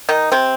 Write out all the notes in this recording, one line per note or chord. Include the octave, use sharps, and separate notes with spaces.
D#3 D#4
C3 C4